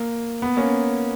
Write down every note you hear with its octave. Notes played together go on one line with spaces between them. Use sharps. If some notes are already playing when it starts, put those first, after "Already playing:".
Already playing: A#3
B3
A#3 C#4